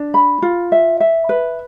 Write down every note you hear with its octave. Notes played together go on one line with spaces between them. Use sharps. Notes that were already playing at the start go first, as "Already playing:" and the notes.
Already playing: D4
B5
F4
E5
E5
B4